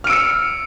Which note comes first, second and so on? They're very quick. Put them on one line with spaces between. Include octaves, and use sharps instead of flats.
F6 D7 E6 C#7